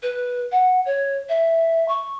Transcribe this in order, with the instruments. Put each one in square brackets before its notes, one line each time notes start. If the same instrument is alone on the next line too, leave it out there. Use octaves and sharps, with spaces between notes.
[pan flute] B4
F#5
C#5
E5
C#6